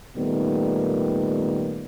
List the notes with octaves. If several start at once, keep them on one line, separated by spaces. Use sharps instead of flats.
A#2 D#3 G3 A3 B3